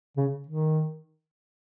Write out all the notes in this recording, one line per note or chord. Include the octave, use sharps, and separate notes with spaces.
C#3
D#3